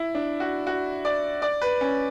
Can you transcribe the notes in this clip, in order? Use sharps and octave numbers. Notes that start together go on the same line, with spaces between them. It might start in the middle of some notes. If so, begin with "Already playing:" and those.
Already playing: E4
D4
F#4
F#4
D5
D5
B4
C#4